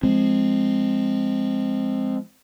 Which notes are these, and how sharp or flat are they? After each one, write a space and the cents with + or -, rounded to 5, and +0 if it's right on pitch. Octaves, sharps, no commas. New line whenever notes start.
F3 +0 G#3 +0 C4 +0